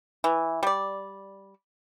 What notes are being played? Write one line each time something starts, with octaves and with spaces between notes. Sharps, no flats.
E3
G3 D5